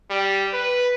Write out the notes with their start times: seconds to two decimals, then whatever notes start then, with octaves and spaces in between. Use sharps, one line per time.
0.10 G3
0.53 B4